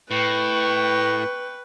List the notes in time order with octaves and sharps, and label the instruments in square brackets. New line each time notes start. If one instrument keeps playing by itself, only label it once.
[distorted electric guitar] A2 [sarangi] B4 [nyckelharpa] G5 C#6